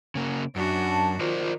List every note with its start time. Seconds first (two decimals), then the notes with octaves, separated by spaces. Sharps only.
0.15 C#3 A#3
0.56 F#2 D4 F#4
0.88 A5
1.20 D#3 F4 A#4 C5 D5